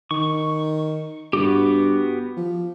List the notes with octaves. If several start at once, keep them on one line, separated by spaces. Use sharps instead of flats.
D#3 C#6
G2 B3 F#4 G4
F3